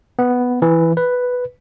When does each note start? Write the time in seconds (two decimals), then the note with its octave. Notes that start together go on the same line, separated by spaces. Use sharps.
0.19 B3
0.62 E3
0.97 B4